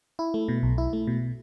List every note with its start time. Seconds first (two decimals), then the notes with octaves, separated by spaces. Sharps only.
0.19 E4
0.34 A3
0.48 B2
0.63 B1
0.78 E4
0.93 A3
1.07 B2